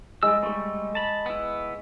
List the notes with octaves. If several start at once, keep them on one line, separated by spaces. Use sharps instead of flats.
G3 G#3 E6
G3 A3 C#6 E6
A5 B5
B3 E4